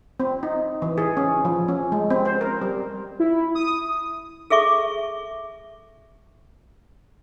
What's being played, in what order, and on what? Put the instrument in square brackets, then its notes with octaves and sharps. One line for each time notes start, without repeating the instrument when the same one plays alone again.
[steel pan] C4
D#4
E3
G#4
C#4
F3
C#4
G#3
C4
C5
A#4
G3
[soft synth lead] E4
D#6
[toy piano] G#4 A4 E5 C#6 D6